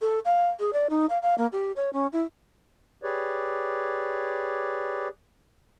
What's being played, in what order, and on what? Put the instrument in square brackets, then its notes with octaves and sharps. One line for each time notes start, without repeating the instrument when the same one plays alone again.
[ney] A4
F5
G#4
D5
D#4
F5
F5
A#3
G4
C#5
C#4
E4
[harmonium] G4 G#4 B4 C#5 D5